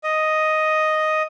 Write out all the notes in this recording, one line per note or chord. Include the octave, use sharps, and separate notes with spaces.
D#5